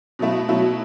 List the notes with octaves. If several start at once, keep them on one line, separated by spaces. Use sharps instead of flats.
B2 F#3 A3 E4
B2 F#3 A3 E4